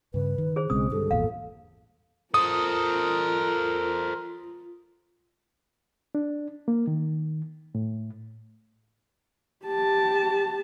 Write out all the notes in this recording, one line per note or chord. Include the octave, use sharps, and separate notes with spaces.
G2 C#3 B4
D#3
G#4 C5
B1 C#3 G#3 C4 D#6
G2 D3 A4
G#1 E2 A#2 F5
F4 A4 A#4 C5 D#6
D4
A#3
D#3
A2
G4 A5